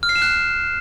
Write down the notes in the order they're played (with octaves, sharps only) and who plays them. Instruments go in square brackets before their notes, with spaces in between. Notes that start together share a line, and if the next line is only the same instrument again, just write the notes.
[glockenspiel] F6
C7
E7
F#6